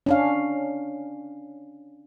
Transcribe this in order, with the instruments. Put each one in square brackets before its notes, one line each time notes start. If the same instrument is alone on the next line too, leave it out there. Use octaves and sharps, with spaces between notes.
[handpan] C#4 D4 F5